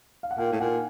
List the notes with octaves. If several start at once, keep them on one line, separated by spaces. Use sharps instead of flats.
F5
F#5
A#2 F5 G5
A2
A#2 F#5 G#5